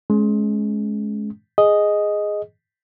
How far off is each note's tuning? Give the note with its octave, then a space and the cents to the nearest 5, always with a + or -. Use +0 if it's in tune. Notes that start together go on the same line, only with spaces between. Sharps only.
G#3 +25 C#4 +0
G#4 +0 D#5 +0